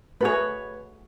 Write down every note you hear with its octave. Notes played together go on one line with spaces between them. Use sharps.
A3 F#4 G#4 B4 C#5